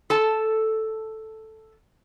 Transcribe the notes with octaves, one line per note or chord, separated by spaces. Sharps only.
A4 A5